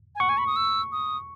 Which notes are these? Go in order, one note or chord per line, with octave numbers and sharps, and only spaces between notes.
G#5
F#5 C#6
G#5
B5
D#6
E6
D#6